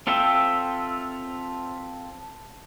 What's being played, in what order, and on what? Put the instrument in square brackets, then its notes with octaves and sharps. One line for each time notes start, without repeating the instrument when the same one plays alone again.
[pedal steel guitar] C4 F4 A4 E5 G5